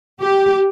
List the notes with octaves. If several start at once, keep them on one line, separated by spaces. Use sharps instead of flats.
G4